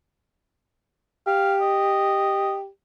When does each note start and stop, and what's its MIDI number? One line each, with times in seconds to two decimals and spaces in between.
1.27 2.68 67
1.27 1.56 77
1.61 2.55 75